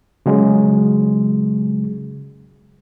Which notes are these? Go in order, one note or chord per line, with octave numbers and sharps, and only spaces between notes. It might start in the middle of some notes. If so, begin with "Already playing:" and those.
C#3 F#3 G#3